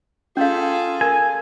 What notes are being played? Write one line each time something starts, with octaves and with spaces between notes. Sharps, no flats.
C#4 F4 G#4 A4 F5
A#4 G#5